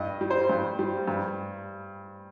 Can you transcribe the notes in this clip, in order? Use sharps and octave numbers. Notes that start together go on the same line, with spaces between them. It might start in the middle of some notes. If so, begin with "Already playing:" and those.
Already playing: G2 D#5
G3
C5
G2
G3
G2